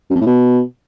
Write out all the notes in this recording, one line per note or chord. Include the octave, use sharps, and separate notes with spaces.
F#2
F2
A2
B2